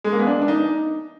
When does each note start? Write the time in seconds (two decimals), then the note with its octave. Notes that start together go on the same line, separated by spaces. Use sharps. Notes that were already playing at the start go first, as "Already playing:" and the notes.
0.04 G#3
0.12 A#3
0.19 B3
0.27 D4
0.41 D4
0.48 D#4